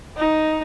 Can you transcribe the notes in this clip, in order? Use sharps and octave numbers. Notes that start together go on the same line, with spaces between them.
D#4